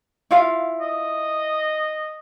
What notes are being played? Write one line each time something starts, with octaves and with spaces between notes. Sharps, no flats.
E4 F4 F5
D#5